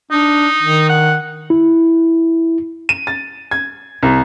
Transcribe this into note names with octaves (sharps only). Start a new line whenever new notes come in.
D4 D#4
D#3
F#5
E4
D#7
A6
G#6
C2